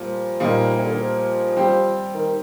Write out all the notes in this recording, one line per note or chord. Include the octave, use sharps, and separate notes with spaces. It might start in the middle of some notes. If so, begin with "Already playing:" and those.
Already playing: A#2 F3 G3
A#2 G3 A#3 D#4
C3
D3
D#3
F3
G3 C4 G4
D#3